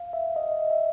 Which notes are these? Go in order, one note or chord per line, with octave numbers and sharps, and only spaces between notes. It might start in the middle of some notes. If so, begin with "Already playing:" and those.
Already playing: F5
E5
D#5
E5